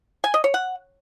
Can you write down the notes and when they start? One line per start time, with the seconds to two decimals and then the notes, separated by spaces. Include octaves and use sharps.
0.24 G#5
0.34 D#5
0.44 C#5
0.54 F#5